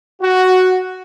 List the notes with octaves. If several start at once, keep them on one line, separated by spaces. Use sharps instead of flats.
F#4